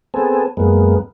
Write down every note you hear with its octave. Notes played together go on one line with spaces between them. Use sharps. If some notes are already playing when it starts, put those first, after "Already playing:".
B3 C4 G#4 A4
F#2 G#3 A#3 B3